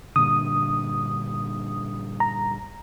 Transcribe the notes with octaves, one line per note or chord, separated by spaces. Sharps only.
G2 A#2 D3 D#6
A#5